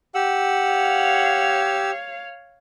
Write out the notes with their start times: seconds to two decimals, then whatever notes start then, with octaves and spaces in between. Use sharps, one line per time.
0.15 G4 F#5 E6
0.66 C#5 F5